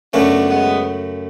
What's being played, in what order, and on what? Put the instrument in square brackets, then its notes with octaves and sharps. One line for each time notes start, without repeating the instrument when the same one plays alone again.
[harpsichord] F#2 C#3 F#3 A3 C#4 [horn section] B3 D4
[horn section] G#3 B3